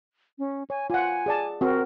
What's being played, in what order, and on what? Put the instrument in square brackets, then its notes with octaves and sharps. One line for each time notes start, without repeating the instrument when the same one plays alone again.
[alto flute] C#4
[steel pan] C#5 [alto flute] G#5
[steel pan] F4 F#5 [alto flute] G#5
[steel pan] G#4 D5 A5
[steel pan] C4 F#4 [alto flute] A#4